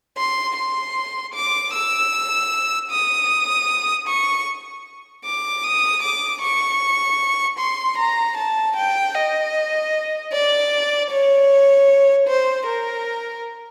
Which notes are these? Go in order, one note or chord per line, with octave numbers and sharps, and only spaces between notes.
C6
C6
D6
E6
D#6
C#6
D6
D#6
D6
C#6
C6
A#5
A5
G5
D#5
D5
C#5
C5
A#4